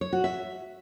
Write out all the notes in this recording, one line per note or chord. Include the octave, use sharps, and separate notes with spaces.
C#5
F#4
E5